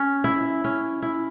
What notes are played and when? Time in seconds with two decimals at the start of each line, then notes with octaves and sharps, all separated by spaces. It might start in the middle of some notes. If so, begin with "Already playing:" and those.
Already playing: C#4
0.24 E4
0.64 C#4
1.02 E4